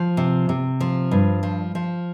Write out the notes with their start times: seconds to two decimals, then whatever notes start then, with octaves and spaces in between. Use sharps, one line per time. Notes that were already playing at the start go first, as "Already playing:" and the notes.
Already playing: F3
0.17 C3
0.49 C3
0.80 F3
1.11 G2
1.43 F3
1.75 F3